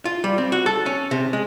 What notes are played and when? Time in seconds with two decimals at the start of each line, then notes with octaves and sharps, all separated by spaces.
0.05 F4
0.24 G3
0.38 C4
0.52 F#4
0.66 A4
0.86 C#4
1.11 C3
1.33 G#3